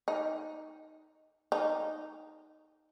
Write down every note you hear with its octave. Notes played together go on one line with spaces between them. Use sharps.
D#4
D#4